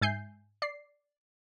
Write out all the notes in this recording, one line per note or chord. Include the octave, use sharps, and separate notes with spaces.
G#2 E5 G#5 G6 C7
D5 C7